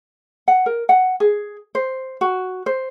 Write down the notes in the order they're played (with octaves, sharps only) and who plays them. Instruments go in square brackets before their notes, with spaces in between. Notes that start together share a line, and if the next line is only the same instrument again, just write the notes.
[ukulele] F#5
A#4
F#5
G#4
C5
F#4
C5